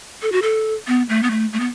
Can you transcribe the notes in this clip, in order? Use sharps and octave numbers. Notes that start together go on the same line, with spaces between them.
A4
F#4
A4
B3
A3
B3
A3
A3
B3